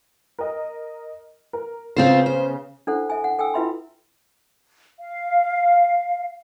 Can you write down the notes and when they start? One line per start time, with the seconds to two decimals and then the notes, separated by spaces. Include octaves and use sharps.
0.39 A#4 D#5
1.53 A#4
1.96 C#3 B3 C4 F4 C5
2.26 C5
2.87 D4 E4 A4 C5 F#5
3.10 A4 E5 G#5
3.24 F#5
3.39 A4 G5 G#5 E6
3.54 E4 F4 B4 E5 B5 C6
4.99 F5